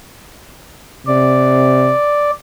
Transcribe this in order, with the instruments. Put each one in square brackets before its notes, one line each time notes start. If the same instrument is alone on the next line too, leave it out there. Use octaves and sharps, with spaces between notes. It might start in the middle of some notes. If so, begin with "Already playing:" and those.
[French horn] C3 [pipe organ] D5